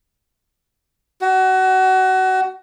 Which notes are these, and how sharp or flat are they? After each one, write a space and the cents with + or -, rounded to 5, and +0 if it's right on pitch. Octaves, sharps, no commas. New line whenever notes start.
F#4 +25